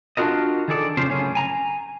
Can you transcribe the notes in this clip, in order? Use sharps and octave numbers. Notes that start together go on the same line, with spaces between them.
D4 F4 F#4 A#4 D#5
D#3 G#4 A4 D5
F2 C#3 C#4 F4 G#4 C5
F#2 A2 C#3 C#4 G#4
G#5 A#5